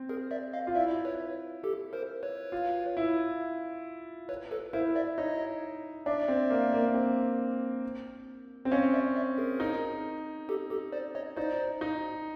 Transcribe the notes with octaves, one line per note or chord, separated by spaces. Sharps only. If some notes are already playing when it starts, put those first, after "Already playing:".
Already playing: C4
G#4 A#4
D5 E5
D#5 F5
F4
E4 D5 E5
B4 C#5
G4 A4
A#4 C5
B4 C#5
F4
E4
B4 C#5
A4 B4
E4 A#4 C5
D5 E5
D#4 C#5 D#5
D4 D5 E5
C4
A#3
A#3
C4
C4
C#4 D#5 F5
D5 E5
D5 E5
G#4 A#4
D#4
G4 A4
G4 A4
C5 D5
C#5 D#5
D#4 C5 D5
D#4